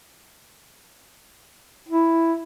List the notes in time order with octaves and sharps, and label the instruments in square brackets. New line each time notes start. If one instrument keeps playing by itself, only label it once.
[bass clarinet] E4